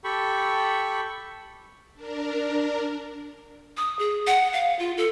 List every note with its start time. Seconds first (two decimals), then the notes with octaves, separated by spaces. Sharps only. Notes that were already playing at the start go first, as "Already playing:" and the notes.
0.04 G4 A4 G5 B5 C#6
1.94 D4 A#4
3.77 D#6
3.99 G#4
4.27 F#5
4.53 F5
4.79 F4
4.97 A4